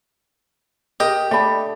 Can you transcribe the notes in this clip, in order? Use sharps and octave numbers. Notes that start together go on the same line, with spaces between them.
G4 A#4 D#5
A3 D4 D5 B5